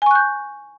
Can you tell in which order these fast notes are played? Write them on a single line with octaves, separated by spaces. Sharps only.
G#5 C#6 F#6 G6